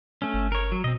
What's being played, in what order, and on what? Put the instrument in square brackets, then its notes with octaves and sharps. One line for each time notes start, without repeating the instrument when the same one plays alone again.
[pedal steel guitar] A3 C#4
[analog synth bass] G1
[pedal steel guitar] A#4 C#5
F#3
[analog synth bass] B2 [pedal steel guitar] C4 D#5